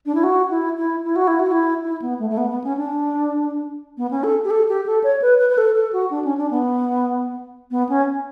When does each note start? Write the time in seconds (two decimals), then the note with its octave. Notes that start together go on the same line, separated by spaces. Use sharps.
0.06 D4
0.15 E4
0.24 F#4
0.50 E4
0.77 E4
1.04 E4
1.16 F#4
1.27 E4
1.39 F#4
1.52 E4
1.84 E4
2.02 B3
2.19 A3
2.30 A3
2.37 B3
2.50 B3
2.64 C#4
2.77 D4
3.97 B3
4.11 C#4
4.24 A4
4.44 G4
4.50 A4
4.69 G4
4.86 A4
5.04 C#5
5.22 B4
5.39 B4
5.50 B4
5.58 A4
5.76 A4
5.93 F#4
6.11 D4
6.24 C#4
6.37 D4
6.51 B3
7.71 B3
7.89 C#4